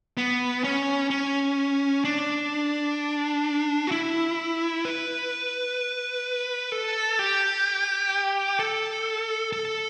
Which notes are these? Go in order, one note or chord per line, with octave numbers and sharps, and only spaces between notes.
B3
C#4
C#4
D4
F#4
E4
B4
A4
G4
A4
A4